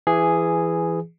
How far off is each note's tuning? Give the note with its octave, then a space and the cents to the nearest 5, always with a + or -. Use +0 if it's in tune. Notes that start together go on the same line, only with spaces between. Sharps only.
E3 +20 G#4 +0